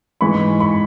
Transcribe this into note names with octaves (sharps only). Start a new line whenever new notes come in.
G#2 E3 G#3 B5 C#6
B5 C#6